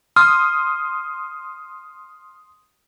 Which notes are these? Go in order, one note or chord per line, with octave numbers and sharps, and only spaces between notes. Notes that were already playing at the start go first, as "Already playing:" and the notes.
C6 D#6 F6